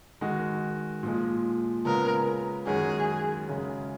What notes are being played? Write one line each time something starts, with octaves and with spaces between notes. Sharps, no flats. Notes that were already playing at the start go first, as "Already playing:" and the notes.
D#3 G#3 D#4 F#4
A#2 F3 G#3
C#3 G#3 B3 F4 A#4
F#2 D#3 G#3 C#4 F#4 G#4
F#2 C#3 G#3